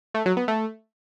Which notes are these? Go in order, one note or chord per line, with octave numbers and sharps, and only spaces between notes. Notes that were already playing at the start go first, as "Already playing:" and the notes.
A3
F#3
B3
A3